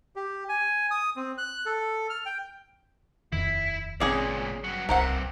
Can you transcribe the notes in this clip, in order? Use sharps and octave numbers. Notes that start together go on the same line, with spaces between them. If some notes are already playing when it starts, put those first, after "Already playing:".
G4
G#5
D#6
C4
F#6
A4
F6
G5
D#1 F2 D#3 E4
G#1 C#2 A#2 D#3 C4 C#4 G#4 D5
G2 F#3
D1 C2 G2 C3 A#4 C5 F#5